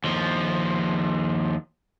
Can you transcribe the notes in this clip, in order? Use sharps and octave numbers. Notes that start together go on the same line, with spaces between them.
D#2 F3